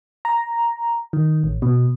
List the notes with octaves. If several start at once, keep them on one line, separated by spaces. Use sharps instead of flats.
A#5
D#3
A1
B2